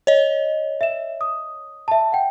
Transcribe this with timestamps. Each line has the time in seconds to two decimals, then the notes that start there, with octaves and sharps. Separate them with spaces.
0.07 C#5 D#5
0.81 E5 E7
1.21 D#6
1.88 E5 A5
2.12 F#5 G5